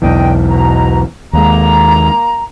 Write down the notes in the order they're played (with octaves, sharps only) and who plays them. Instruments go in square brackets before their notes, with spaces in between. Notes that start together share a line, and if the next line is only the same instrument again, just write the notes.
[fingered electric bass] B1 E2 E3 [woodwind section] D4 D#5 G5
[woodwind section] B2 A#5
[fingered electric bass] D#2 G#3 [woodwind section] A#3 A#5